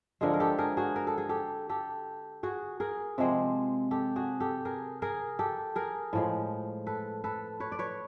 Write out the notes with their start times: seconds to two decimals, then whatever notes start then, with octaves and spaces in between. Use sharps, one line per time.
0.21 D3 F3 G#3 G#4 A#4
0.34 A#4
0.40 G4 A4
0.58 G#4 A#4
0.77 F#4 G#4
0.96 A#4
1.07 A4
1.18 G#4
1.29 G4 A4
1.69 G4 A4
2.43 F#4 G#4
2.80 G#4 A#4
3.18 C3 F3 G#3 C4
3.91 G4 A4
4.16 F#4 G#4
4.40 G4 A4
4.65 G#4 A#4
5.02 G#4 A#4
5.39 G4 A4
5.76 G#4 A#4
6.13 A2 F3 G#3
6.87 A4 B4
7.24 A4 B4
7.60 B4 C#5
7.72 D5
7.79 B4 C#5